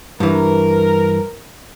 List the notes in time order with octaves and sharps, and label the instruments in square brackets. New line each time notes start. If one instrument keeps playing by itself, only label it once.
[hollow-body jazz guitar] G2 E3 [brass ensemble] A#4